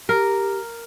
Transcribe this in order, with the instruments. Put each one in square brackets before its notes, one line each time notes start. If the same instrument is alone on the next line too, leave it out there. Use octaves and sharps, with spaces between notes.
[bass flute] G4 [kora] A#4